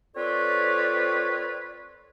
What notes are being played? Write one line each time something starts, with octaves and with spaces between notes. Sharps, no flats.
C4 F4 A4 B4 C#5 D5